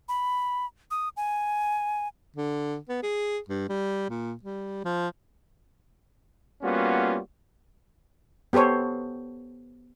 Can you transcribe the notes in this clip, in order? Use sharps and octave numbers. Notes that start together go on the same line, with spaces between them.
B5
D#6
G#5
D3
B3
G#4
G2
G3
A#2
G3
F3
G3 A#3 B3 C#4 F4 F#4
B3 G4 A4 C5 C#5